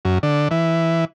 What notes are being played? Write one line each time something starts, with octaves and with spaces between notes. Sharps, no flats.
F#2
D3
E3